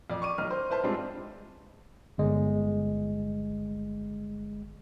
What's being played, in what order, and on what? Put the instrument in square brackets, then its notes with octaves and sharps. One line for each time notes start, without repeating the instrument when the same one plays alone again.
[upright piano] F2 D5
C#6 D6 D#7
B1 D#4 F6
C5
E4 B4 C5 A5
G#2 G3 G#3 C4 D4 F4
[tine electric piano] G1 G#3